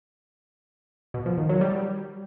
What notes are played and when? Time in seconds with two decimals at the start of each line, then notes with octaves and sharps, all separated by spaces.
1.14 B2
1.26 F3
1.38 D#3
1.49 F#3
1.61 G3